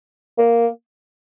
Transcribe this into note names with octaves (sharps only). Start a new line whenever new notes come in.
A#3